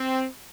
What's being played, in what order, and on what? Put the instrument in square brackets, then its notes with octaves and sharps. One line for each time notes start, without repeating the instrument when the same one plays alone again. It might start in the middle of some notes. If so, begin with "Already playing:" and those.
Already playing: [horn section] C4